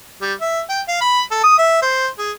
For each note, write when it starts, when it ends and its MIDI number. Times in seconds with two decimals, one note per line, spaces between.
0.21 0.33 55
0.41 0.61 76
0.69 0.81 79
0.88 0.98 77
1.01 1.22 83
1.31 1.40 69
1.43 1.57 87
1.58 1.81 76
1.82 2.07 72
2.18 2.32 68